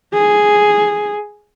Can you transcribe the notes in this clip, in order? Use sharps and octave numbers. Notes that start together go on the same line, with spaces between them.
G#4